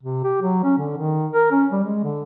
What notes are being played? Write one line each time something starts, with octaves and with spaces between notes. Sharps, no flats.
C3
G4
F#3
C#4
D3
D#3
A#4
C#4
G3
G#3
D3